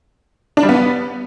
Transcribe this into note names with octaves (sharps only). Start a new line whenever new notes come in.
D4
G3
B3